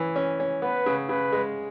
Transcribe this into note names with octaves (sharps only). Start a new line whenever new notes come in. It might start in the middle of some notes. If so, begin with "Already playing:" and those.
Already playing: E3 C#4
C#4
C#4
B3 B4
C#3
C#3 B4
G#3